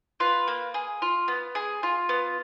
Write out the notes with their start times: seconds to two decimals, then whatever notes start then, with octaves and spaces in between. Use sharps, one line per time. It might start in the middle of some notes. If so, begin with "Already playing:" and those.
0.20 F4 B4
0.48 A#3
0.74 G#4
1.02 F4
1.28 B3
1.55 G#4
1.83 F4
2.09 B3